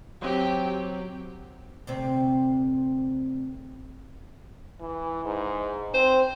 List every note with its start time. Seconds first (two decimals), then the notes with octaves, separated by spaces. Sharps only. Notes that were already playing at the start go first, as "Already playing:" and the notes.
0.22 F#3 C4 G4
1.87 D2 C3 C4
4.80 E3
5.25 G#2
5.94 C4 C5